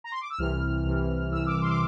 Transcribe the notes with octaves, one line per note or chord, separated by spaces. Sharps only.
A#5
C6
D6
E6
C2 C3 E3 F6
C2 C3 E3
C2 C3 E3 E6
D6
C6
D6